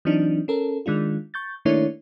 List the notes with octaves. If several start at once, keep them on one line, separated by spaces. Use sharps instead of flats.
E3 F#3 C4 D4 D#4
C#4 A4 A#4
D#3 G#3 D4 F4
C#6 G6 A6
D#3 A3 A#3 D4 E4 C#5